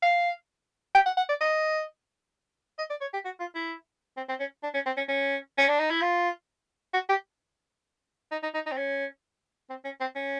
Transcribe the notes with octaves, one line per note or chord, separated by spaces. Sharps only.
F5
G5
F#5
F#5
D5
D#5
D#5
D5
C#5
G4
F#4
F4
E4
C4
C4
C#4
D4
C#4
C4
C#4
C#4
C#4
D4
D#4
E4
F4
F#4
G4
D#4
D#4
D#4
D#4
C4
C#4
C4
C#4
C4
C#4